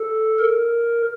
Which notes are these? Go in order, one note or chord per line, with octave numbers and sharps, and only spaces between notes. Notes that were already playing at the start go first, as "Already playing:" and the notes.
Already playing: A4
A#4